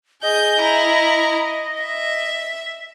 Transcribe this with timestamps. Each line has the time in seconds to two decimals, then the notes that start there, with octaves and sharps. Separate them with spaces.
0.22 G#4 D#5 G6
0.60 E4 A#5
1.82 E5